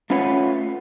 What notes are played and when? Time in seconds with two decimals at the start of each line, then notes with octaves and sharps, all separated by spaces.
0.10 A3 C#4 F4 B4 C#5 F#5